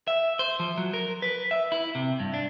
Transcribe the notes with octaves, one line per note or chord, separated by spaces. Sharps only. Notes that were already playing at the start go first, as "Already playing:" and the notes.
E5
C5
F3
F#3
A#4
B4
E5
E4
C3
G2
D4